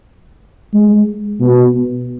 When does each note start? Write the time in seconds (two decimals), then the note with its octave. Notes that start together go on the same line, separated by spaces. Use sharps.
0.74 G#3
1.41 B2